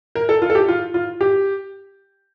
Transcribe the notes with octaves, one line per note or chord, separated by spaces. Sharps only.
A#4
A4
F4
A4
G4
F4
F4
G4